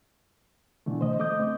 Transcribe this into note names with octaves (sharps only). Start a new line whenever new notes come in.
B2 D3 E3 A3
C5 D#5
A3 D#5 D6 D#6 G6
C4